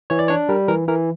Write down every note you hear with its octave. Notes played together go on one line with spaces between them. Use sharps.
E3 C#5
D5
D4 C#5
G3 A#4
E3 A#4
E3 A#4